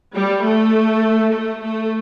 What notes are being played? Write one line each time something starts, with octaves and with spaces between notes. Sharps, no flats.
G3
A3
A3
A3